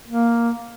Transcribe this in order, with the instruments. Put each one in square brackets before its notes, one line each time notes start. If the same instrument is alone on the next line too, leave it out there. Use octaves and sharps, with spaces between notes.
[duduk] A#3